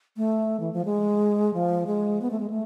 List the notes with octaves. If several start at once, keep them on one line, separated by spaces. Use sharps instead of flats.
A3
E3
F3
G#3
F3
G#3
B3
A3
G#3
A3